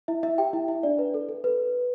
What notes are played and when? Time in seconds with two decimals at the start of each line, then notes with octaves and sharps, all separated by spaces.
0.08 E4 E5
0.23 E4 E5
0.38 G4 G5
0.53 E4 E5
0.68 E4 E5
0.83 D4 D5
0.99 B4
1.14 A4
1.29 A4
1.44 B4